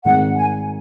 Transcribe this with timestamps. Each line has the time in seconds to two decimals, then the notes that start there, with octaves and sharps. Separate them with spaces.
0.04 G#1 G#2 D#3 F#5
0.36 G#5